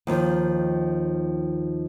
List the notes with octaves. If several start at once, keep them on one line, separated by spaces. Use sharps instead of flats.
D#2 D#3 F3